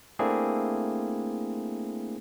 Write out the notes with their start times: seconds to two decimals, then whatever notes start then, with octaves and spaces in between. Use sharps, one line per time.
0.19 A3 A#3 C4 D4 E4 G#4